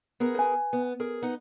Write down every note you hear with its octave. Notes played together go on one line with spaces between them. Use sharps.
B3 G#4 A#4
B4 G#5
B3
G#4 A#4
B3 D#4 F#5